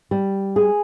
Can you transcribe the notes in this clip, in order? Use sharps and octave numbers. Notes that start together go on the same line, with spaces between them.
G3
G#4